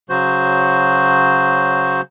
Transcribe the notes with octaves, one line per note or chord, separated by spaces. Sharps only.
C#3 F#3 F#4 C5